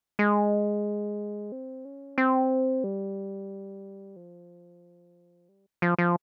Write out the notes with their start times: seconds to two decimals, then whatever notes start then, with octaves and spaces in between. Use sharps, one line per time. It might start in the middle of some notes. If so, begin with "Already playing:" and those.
0.19 G#3
1.52 C4
1.85 C#4
2.18 C4
2.84 G3
4.16 F3
5.49 G3
5.82 F3
5.98 F3